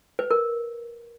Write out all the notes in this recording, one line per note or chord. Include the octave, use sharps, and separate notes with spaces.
B4
A#4